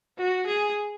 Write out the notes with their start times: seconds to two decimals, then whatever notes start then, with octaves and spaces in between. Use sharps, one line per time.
0.18 F#4
0.46 G#4